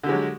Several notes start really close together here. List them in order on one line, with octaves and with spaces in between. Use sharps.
D3 G4 G#3 F#3